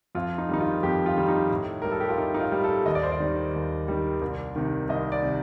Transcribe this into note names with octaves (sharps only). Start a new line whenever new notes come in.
F2 F4
D#4
D#3 G3 D#4
F4
F2 G4
F4
D#3 G3
D#4
A2
G3 A#4
A4
G4
F4
A2 D#4
D#4
F4
G3
A4
D#2 D#5
D5
C5
D5
D#3 G3
D#2
D#3 G3
C2
C3 D#3
C2 D#5
D5
C3 D#3